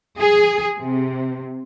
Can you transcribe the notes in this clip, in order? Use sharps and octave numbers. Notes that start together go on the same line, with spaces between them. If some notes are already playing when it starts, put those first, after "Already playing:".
G#4
C3